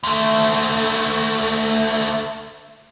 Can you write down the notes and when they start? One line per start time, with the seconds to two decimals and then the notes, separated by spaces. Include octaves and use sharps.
0.04 D2 A3